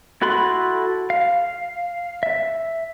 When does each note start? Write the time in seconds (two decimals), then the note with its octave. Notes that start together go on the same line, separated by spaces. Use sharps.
0.22 E4 F#4 A4 B5 C6
1.10 F5
2.23 E5